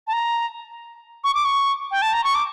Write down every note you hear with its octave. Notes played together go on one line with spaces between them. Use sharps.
A5
A#5
C#6
D6
C#6
G5
A5
A#5
C#6
D6